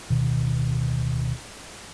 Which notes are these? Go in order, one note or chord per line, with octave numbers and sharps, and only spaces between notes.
D1 B2 D#3